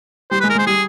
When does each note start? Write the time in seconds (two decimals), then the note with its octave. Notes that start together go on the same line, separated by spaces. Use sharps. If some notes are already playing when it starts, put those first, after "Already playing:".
0.31 G3 C5
0.40 B4
0.44 G#3
0.50 A#4
0.55 G#3
0.59 C5
0.67 G3 G#4